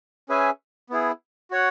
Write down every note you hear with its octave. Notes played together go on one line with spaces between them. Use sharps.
C#4 G#4 B4 E5 G#5
B3 E4 G#4
F#4 C#5 F#5